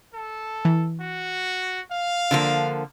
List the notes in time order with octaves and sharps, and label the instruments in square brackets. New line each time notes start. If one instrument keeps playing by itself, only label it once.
[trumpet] A4
[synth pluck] E3
[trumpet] F#4
F5
[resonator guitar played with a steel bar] D3 F3 A#3